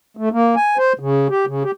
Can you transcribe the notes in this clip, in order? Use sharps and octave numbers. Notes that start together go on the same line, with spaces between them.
A3
A#3
G#5
C5
C#3
G4
C#3
G4